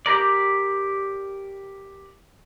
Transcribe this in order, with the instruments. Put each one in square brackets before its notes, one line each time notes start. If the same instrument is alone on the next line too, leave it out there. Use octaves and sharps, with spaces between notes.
[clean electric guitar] G4 A#4 D5